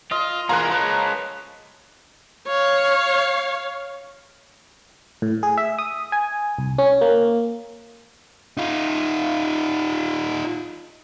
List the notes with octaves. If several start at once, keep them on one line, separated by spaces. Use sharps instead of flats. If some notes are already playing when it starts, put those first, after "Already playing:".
F4 D#5
E3 F3 G#3 A#3 A#5 C6 F#6
G#3 C#4 B4
C#5 F5
A2
G#4
E5
D#6
G#5
C2
C#4
A#3
D#4 F4